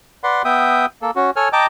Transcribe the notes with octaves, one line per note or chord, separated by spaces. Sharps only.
B4 D5 F#5 C6
B3 E5 G5 D#6
A#3 A4
C#4 F#4
A4 C#5 G#5 F6
D#5 G5 A5 A#5 D6